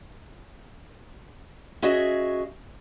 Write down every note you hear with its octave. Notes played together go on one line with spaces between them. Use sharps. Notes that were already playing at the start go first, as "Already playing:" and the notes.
C#4 F#4 G#4 D#5 E5